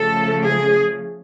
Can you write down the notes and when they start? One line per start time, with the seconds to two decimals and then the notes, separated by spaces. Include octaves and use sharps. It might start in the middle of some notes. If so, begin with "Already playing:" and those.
Already playing: C#3 F3 A3 A4
0.44 G#4